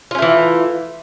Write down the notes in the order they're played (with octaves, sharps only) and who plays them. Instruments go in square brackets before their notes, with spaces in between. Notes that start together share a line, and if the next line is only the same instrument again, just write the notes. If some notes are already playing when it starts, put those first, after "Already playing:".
[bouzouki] F4
C#4
A3
E3